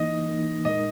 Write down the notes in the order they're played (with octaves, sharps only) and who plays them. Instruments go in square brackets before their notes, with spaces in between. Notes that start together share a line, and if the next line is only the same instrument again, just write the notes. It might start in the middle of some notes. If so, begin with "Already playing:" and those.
Already playing: [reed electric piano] E3 A#3 D#4 [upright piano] D#5
[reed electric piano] E3 A#3 D#4
[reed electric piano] A#2 G#3 D#4 A#4 [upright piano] D#5